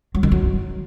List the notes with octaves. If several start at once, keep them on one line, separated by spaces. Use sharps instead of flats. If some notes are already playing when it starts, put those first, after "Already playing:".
F#3
D#3
F#3